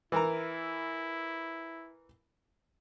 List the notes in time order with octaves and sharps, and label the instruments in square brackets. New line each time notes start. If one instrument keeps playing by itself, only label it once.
[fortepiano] E3 A#4 A#5 [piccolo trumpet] E4